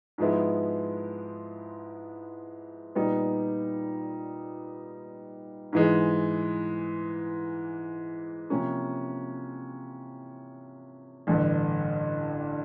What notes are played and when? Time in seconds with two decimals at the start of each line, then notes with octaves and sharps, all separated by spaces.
0.18 G#2 F3 G#3 B3 E4
2.95 A#2 G3 B3 D#4
5.73 G#2 E3 G#3
8.50 C3 F3 A#3 C#4
11.27 A1 G2 D3